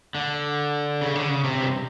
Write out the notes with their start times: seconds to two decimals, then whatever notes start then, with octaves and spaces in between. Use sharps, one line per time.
0.15 D3
1.01 C#3
1.15 D3
1.30 C#3
1.44 C3
1.61 G2